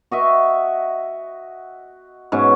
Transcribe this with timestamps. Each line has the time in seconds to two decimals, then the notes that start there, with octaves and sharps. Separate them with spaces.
0.11 F#4 D#5 E5
2.32 G#2 B2 C#4